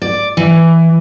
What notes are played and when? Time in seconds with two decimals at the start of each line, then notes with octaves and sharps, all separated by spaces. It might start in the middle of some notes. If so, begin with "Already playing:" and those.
0.02 D5
0.37 E3